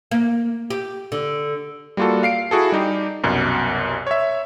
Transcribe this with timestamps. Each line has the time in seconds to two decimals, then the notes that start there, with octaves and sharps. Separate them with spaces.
0.11 A#3
0.70 G4
1.12 D3
1.97 G3 A#3 F4 F#4 A4
2.23 F5 C7 D7
2.51 E4 F#4 G#4 A4
2.72 G3 D#4 G4
3.23 C2 F#2 B2
4.07 C#5 E5